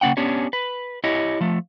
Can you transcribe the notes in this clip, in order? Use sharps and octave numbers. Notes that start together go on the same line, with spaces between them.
C#3 A#3 B3 C#4 F#5 G5
B3 C#4 D4 G4 C#5
B4
E4 G4 C#5 D#5
F3 A3